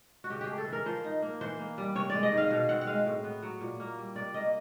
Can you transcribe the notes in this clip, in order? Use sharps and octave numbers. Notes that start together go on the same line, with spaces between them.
F#4
C#3 G4
G4 G#4
A3
A4
E3 A#4
F3 C5
D#4
A#3
E3 C5
A#3
G3
C3 C#5
G#3 D5
D#5
D#3
F5
B2 F5
C4 F#5
F#5
G#3 F5
A2
B3
F#3
A#2
A#3
G3
C3 D5
A#3 D#5